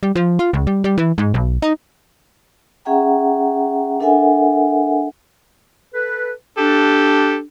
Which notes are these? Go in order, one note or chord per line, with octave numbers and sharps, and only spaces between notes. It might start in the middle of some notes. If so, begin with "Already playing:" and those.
G3
F3
F4
C#2
G3
G3
E3
G#2
B1
D#4
C#4 G#4 E5 F#5 G5 A#5
D4 A4 A#4 E5 F#5 G#5
A4 B4
D4 G4 A4